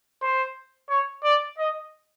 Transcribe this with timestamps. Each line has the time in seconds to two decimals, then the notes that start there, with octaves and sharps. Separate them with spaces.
0.22 C5
0.90 C#5
1.24 D5
1.58 D#5